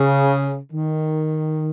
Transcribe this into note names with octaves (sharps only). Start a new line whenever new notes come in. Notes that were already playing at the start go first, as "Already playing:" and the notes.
Already playing: C#3
D#3